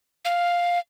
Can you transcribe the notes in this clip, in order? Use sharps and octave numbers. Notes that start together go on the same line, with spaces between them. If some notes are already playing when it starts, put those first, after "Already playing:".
F5